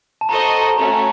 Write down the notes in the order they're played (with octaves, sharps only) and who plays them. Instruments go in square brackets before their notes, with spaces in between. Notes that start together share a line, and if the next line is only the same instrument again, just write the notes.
[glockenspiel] A5
[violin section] F#4 A4 C5 D#5 [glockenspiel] A#5
[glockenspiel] A5
A#5
[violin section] A3 C#4 F#4 [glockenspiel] A#5